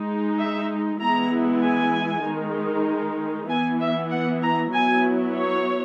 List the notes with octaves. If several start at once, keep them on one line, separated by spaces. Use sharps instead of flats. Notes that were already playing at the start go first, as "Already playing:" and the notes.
Already playing: G#3 D#4
E5
E3 G#3 B3 E4 A#5
G#5
D#3 G#3 D#4
E3 B3 E4 G#5
E5
F#5
A#5
F#3 B3 E4 G#5
C#5